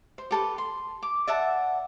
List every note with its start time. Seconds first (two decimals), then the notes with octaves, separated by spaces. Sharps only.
0.18 C5
0.31 G4 A4 B4
0.58 C6
1.02 D6
1.27 D5 E5 F#5 A5